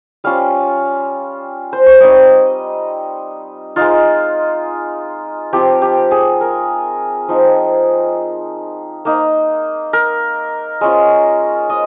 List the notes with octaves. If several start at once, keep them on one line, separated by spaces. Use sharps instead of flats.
G3 C#4 F4 F5
C5
C#5
G3 C4 D#4 D#5
G#3 D#4 F4
F3 C4 F4 G4
G4
G#4
A#4
F3 C4 D#4
A#3 D#4
A#4
G#3 C#4 F4
D#5